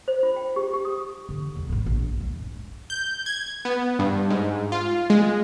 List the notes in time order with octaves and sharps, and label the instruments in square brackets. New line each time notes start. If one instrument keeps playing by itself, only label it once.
[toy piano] C5
F4
G5
G4
G4
D#6
[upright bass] D3
E2 G#3
G#1 A2
A#1 D3
E2 G#3
G#1
[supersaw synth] G6
G#6
B3
G2
G#2
F4
G#3